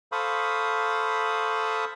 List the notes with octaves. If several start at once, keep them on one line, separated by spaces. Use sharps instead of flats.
A4 C5 F5 B5 C#6 D#6